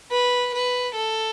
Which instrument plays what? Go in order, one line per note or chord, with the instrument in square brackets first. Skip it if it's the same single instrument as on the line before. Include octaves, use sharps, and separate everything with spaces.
[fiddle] B4
B4
A4